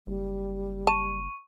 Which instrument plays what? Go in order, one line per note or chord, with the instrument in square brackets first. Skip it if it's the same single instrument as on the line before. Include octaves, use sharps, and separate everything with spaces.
[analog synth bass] F#1 [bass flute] G3
[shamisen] A5 [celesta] C#6 D#7